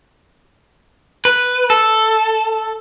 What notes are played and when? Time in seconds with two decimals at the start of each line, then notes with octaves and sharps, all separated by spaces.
1.25 B4
1.70 A4